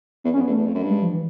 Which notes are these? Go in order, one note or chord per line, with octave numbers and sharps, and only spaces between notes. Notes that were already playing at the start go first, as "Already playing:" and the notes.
E2 B3
F2 C#4
B3
E2
A3
E2
F2
F#2
G2
G#3
F3
E3